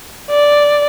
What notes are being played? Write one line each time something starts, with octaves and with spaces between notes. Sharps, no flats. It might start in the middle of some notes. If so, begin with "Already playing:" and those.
D5